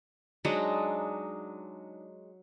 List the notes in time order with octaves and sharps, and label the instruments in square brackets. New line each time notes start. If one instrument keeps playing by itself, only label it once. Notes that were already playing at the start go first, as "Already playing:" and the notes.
[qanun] F#3 G#3 D4 D#4